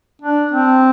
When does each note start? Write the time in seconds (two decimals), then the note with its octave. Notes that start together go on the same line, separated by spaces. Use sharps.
0.22 D4
0.52 C4